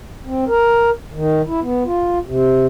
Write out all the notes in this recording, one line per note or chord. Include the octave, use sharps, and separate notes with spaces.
C4
A#4
D#3
E4
B3
F4
C3